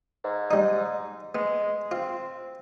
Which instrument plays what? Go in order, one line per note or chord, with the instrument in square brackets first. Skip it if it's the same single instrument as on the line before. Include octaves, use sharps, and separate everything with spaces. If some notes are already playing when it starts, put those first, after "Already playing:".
[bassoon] G#2
[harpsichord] G3 D#4
[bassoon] G#3 [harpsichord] B3
[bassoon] C4 [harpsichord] F4